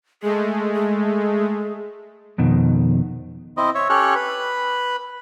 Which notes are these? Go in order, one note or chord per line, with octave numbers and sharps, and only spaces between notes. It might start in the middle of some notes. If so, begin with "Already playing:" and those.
G#3 A3 G#4
G#4
F2 B2 D#3
C4 E4 D#5
C#5 E5
C#4 G4 A4 C#5 F6 F#6
B4 B5